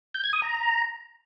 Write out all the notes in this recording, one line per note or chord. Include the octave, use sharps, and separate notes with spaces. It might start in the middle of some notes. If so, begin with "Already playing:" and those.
G6
G#6
D#6
A#5